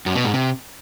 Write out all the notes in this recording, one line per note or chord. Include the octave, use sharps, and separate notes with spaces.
F#2
B2
G#2
C3